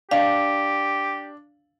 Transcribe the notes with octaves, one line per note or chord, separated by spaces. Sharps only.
D4 G4 F5